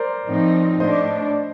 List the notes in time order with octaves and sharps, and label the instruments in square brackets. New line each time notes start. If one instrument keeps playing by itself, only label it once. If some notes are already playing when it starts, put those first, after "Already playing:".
Already playing: [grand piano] A#4 C5 D5
[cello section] A2 F3 C4 D#4
[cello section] A2 A3 D4 [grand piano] C5 D#5